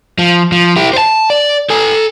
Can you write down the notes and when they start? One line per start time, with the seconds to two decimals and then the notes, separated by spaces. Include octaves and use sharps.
0.18 F3
0.52 F3
0.76 E4 G4
0.93 C5 A5
1.30 D5
1.70 A4 G#5